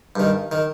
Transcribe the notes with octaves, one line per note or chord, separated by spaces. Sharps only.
G2 D#3
D#3